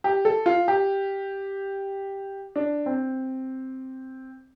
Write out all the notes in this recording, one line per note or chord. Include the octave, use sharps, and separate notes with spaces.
G4
A4
F4
G4
D4
C4